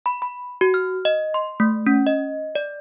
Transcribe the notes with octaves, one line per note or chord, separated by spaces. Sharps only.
B5
B5
F#4
F6
D#5
C6
A3
C#4
D#5
D5